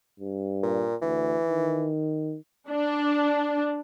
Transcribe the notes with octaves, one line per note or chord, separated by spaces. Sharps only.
G2
A#2
D2 E3
D#3
D4